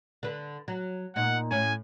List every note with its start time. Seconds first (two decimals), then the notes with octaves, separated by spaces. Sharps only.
0.23 D3 B4
0.68 F#3
1.16 A#2 D#4 F#5
1.51 A2 C#4 G#5